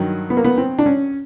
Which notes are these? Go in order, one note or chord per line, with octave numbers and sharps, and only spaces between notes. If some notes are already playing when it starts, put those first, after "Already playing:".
Already playing: G2 D#3 F#3
B3
A#3
B3
C4
D4
C#4